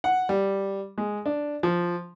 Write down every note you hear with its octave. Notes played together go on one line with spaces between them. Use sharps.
F#5
G3
G#3
D4
F3